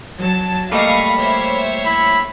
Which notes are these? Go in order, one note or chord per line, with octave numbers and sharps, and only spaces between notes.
F#3 A5
G3 A3 A#3 D#5 F5 B5 C#6
C5 C#5 E5
E4 B5